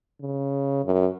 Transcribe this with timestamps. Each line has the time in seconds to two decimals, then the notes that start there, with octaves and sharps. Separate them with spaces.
0.21 C#3
0.85 F#2